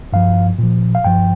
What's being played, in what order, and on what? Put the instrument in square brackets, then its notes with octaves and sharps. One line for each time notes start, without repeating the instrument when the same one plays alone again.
[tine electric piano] G2 F3 F5
A#2 F3
F5
G2 F3 G5